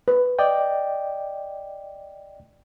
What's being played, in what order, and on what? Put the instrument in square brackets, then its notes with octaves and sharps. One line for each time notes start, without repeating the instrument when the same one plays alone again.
[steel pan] B4
[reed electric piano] D5 D#5 G5